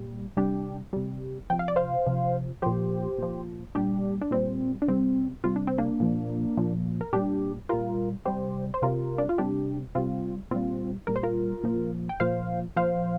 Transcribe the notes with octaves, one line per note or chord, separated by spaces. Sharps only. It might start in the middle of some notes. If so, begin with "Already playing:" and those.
Already playing: A#2 G3
C3 G3 D4 G4
C3 G3
C3 F3 G5
F5
D5
C5 F5
C3 F3
A#2 F3 G4 C5
A#2 F3
A#2 G3 D4 G4
D4
A#2 G3 C4
D4
C3 G3 C4
C3 G3 F4
D4
C4
A#3 D4
A#2 F3
A#2 F3
A#4
A#2 G3 D4 G4
A#2 G3 F4 A#4
C3 G3 G4 C5
C5
C3 G3 F4 A#4
D4
F4
C3 G3 D4 G4
C3 G3 C4 F4
A#2 G3 C4 F4
A#2 G3 A#4
C5
F4 A#4
A#2 F3
G5
A#2 F3 C5 F5
A#2 F3 C5 F5